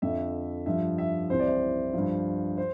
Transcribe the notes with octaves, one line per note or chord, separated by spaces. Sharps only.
F2 D3 F3 E5
G2 F3 E5
E5
C2 C3 E3 C5
D5
C5
G2 F3
C5